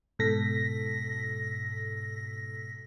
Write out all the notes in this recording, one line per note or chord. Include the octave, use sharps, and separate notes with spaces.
G#2 B2 A4 A#6 B6